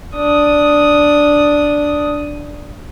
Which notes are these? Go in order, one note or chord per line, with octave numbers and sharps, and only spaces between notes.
D4 D#6